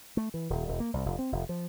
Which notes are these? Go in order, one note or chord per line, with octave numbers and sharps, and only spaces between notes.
A3
E3
D#1
E1
A#3
C2
F1
C4
F1
F3